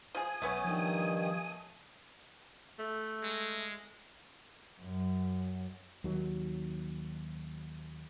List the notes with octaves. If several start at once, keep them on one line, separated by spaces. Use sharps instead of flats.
F3 G#4 G#5 D#6
B1 A3 B3 C#4
G2 D#3 F3
A3
G#3
F#2
D#2 F#3